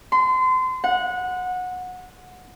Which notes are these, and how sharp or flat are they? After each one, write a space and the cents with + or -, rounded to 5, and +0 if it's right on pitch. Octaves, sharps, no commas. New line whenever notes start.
C6 -30
F#5 -20